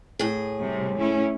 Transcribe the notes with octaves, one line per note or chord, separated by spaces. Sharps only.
A2 G#4
C3 G3
A3 C#4 E4